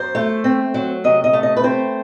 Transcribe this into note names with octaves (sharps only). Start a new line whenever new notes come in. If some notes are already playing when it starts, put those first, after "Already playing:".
Already playing: F#2 C5
A3
C4
F#3
C3 D#5
D#5
A3
D#5
B4
C4 C5